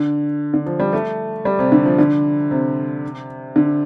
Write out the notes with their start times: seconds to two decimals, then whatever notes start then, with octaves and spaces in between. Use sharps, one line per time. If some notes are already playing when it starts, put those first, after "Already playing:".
Already playing: D3
0.54 D3
0.66 F3
0.80 G3
0.93 A3
1.45 G3
1.59 C3
1.72 D3
1.86 F3
1.98 D3
2.51 C3
3.56 D3